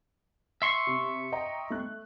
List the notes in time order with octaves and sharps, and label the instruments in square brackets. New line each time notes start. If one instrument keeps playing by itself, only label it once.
[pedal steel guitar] E5 C6 C#6
[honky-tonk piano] C3
D#5 G5 A#5
A3 F#6